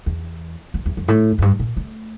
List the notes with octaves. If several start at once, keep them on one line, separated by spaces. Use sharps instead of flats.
E2
F2
E2
F2
A2
F2
G2
A#2
A3